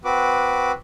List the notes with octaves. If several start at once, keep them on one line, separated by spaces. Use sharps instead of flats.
C4 F#4 B4 D6